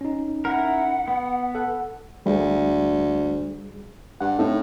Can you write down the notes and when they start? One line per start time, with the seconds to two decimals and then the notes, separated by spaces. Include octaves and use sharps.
0.01 C#4 D#4
0.45 E4 A#4 F#5
1.08 B3
1.55 A4 F#5
2.26 D2 G3 G#4
4.21 G2 F#5
4.39 A2 C4 D#4 A4